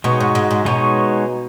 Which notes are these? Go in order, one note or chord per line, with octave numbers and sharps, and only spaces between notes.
B2 G#3 D#4 F#4 C#5
G#2
G#2
G#2
B2 G#3 D#4 F#4 C#5